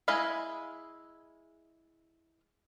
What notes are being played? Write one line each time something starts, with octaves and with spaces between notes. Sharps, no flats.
G#3 E4 D#5 F5 B5